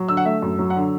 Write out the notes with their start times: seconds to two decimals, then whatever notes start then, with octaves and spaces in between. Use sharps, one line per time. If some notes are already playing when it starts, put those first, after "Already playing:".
Already playing: F#3
0.08 D3 E6
0.17 F#5
0.25 A3 E5
0.42 F#2
0.59 F#3
0.70 F#5
0.76 D3